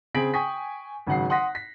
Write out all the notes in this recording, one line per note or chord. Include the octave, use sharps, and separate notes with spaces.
C#3 C4 G#4 B6 D7 F#7
G5 G#5 C#6 D#6 B6
G#1 C#3 F#3 F#5 C7
F#5 C6 D#6 F#6 A#6 B6
B6